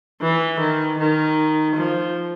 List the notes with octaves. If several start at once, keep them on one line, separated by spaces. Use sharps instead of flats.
E3
D#3
D#3
F3